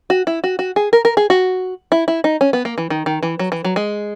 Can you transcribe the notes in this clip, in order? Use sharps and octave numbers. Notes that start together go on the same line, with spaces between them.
F#4
E4
F#4
F#4
G#4
A#4
A#4
G#4
F#4
E4
E4
D#4
C#4
B3
A#3
E3
D#3
D#3
E3
F#3
E3
F#3
G#3